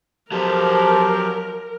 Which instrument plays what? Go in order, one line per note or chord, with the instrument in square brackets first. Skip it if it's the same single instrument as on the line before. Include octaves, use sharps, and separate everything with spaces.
[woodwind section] F3 G4 [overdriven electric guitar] F#3 A4 [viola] A#4